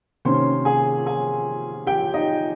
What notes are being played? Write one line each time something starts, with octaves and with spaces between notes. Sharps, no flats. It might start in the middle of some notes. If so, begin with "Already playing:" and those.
C3 D#3 A#3 C#4 C5 C6
G#4 G#5
G#4 G#5
G4 G5
D#4 D#5